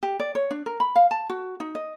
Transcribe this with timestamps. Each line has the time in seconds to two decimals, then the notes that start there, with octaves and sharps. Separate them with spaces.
0.03 G4
0.20 D5
0.35 C#5
0.51 D4
0.66 A#4
0.80 B5
0.96 F5
1.11 A5
1.30 F#4
1.60 D#4
1.75 D#5